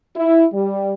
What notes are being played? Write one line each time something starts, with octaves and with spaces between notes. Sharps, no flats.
E4
G3